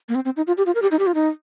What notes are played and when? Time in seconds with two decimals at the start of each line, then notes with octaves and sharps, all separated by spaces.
0.09 A#3
0.15 C4
0.25 C4
0.37 D#4
0.47 F4
0.58 G4
0.66 F4
0.75 A#4
0.82 G4
0.91 D#4
0.99 G4
1.07 F4
1.15 D#4